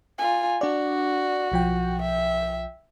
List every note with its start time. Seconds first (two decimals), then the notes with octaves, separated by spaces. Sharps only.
0.18 F4 G#5
0.61 D4 F#4 D5
1.52 B1 F3 G5
2.02 E5